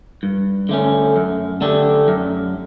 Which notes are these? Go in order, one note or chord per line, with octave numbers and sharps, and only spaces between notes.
G2
D3 A3 C#4
F#2
D3 A3 D4 G4
F#2